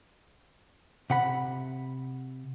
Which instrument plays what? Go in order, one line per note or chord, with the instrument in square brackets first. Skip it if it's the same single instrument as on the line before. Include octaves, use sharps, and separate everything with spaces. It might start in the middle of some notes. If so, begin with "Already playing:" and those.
[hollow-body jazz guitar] C3 F#5 B5